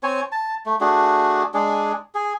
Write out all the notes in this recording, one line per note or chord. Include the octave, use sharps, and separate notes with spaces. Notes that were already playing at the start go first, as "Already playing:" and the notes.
C4 C#5 G#5
A5
A3
A3 D4 F#4 G#4
G#3 D4 G#4
G#4